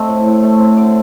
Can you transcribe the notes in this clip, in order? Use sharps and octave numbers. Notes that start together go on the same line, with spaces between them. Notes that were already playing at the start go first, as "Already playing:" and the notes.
Already playing: A3 C4 D#5
A2
A2
A3
C4
D3 D5